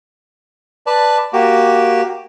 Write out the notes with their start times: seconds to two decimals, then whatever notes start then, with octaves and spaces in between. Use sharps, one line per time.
0.87 B4 D5 A5
1.33 A#3 F#4 G4